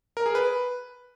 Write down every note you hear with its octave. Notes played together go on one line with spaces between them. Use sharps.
A#4
G#4
B4